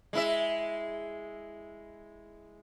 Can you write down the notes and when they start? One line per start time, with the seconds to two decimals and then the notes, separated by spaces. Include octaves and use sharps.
0.13 G#3 E4 E5